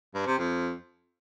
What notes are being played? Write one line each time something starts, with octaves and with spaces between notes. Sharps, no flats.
G2
C3
F2